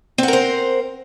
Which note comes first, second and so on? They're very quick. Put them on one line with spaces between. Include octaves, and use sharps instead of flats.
C4 F#5 A#4 C5